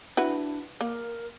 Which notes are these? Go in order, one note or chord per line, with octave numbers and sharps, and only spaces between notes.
D4 E4 F#4 B4
A#3 A#4